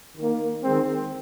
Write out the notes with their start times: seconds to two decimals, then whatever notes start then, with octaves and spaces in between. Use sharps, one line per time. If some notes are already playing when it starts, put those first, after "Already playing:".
0.16 D#3 A#3
0.62 D#3 G#3 C4